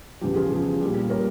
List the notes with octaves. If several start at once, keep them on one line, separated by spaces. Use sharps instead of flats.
E2 C#3 F3 G4
F4 G#4
E2 C#3 F3
A#2 G3
A#2 G3 A#4 C#5